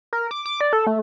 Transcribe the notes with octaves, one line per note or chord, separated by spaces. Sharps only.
A#4
D6
D6
D5
A4
A3